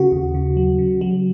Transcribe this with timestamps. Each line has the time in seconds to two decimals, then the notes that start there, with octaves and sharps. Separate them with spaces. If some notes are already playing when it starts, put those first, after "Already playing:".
Already playing: C#3 F#4
0.12 D#2
0.34 C#3
0.57 F#3
0.79 C#3
1.01 F#3